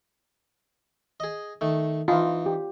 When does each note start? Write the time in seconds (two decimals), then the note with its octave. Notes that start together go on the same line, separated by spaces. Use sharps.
1.20 G#4 D#5
1.61 D#3 A3
2.08 E3 D#4 F4
2.46 G4